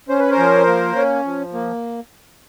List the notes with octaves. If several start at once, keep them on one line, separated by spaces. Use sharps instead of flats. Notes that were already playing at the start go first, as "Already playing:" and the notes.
C#4 C5
B4
A#4 C5
F3
A#3
C#4
F3
A#3